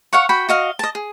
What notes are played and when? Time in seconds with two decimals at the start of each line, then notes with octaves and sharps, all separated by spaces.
0.13 C#5 F5 F#5 C#6
0.29 F#4 G5 B5
0.49 F#4 D#5 F5
0.79 D#5 A5
0.95 G#4